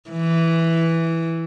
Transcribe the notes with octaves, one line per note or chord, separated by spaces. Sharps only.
E3